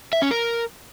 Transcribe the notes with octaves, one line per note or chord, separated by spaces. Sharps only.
E5
C#4
A#4